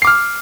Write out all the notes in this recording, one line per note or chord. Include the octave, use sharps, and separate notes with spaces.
D6 F6 C7